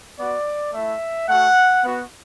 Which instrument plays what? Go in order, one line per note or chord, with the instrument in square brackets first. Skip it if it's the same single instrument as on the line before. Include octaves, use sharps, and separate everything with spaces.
[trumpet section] B3 F#4 D5
A3 E4 E5
A3 F#4 F#5
B3 F#4